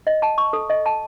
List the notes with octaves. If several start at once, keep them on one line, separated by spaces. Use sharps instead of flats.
D#5
A5
C#6
A4
D#5
A5